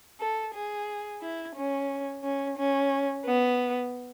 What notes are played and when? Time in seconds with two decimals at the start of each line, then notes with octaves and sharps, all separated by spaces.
0.20 A4
0.55 G#4
1.22 E4
1.56 C#4
2.24 C#4
2.58 C#4
3.26 B3